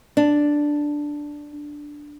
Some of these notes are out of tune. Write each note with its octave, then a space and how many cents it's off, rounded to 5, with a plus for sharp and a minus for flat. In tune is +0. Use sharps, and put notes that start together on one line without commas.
D4 +0